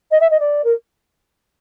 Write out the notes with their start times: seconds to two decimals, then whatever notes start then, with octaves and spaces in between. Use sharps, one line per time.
0.11 D#5
0.20 E5
0.30 D#5
0.39 D5
0.63 A#4